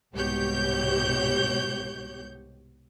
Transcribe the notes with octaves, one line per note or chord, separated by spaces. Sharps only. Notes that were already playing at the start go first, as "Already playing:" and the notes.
C2 G#2 B2 G4 C#5 G6